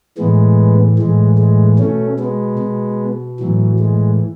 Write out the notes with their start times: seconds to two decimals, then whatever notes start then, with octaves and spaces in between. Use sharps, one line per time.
0.18 A2 E3 G#3 B3
0.99 A2 E3 G#3
1.38 G#3
1.78 B2 A3 C#4
2.19 G#3 B3
2.59 B2
3.40 A2 E3 F#3
3.79 G#3